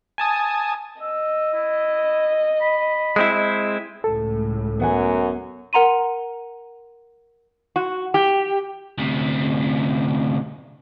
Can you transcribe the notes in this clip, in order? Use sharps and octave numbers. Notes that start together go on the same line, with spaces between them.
G#5 A5 D#6
D#5 E6
E4
B5
G#3 C4 E4
C#2 A2 A4
F#2 B3 F#5 G#5
A#4 F#5 A#5 C6 D#7
F#4
G4
D2 C3